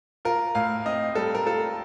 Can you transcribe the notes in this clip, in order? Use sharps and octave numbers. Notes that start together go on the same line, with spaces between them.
F4 A#4
A2 F5
C4 D#5
G3 A4
A#4
F4 A4